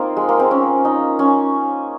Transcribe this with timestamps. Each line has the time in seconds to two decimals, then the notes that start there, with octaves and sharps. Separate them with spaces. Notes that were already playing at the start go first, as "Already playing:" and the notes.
Already playing: A#3 C4 D#4 F4
0.17 G#3
0.29 A#3
0.40 C4
0.51 C#4
0.85 D#4
1.19 C#4